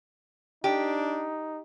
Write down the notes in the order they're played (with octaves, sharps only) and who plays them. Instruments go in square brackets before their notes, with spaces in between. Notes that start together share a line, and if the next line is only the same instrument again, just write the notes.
[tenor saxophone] D4 [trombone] D#4 [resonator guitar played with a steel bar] G4